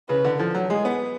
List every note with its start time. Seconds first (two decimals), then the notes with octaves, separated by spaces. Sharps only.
0.09 C#3 B4
0.24 D3
0.39 F3 A4
0.55 F#3
0.69 G#3 G#4
0.85 B3